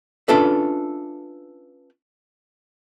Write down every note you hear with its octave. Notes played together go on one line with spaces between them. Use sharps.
C#4 D4 F4 A4 B4 E5